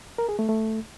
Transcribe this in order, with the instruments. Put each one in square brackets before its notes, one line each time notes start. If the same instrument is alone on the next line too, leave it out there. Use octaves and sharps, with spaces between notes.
[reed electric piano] A#4
G#4
A3
A3